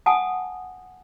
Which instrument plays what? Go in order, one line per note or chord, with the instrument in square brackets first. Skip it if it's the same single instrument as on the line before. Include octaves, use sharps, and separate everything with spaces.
[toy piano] F#5 G#5 A5 D#6